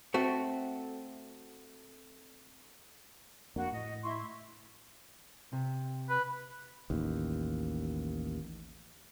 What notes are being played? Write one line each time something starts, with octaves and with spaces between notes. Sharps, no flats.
A3 C4 F#4
F2 A#3 D4 F#4
A2 D#5
E4 C6 C#6
C3
B4
A1 D#2